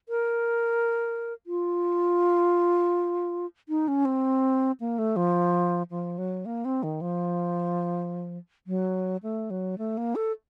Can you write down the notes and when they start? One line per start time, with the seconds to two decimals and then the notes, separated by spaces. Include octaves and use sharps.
0.09 A#4
1.47 F4
3.69 D#4
3.88 C#4
4.05 C4
4.80 A#3
4.98 A3
5.16 F3
5.91 F3
6.18 F#3
6.46 A#3
6.65 C4
6.83 D#3
7.01 F3
8.67 F#3
9.23 A3
9.50 F#3
9.78 A3
9.97 A#3
10.15 A4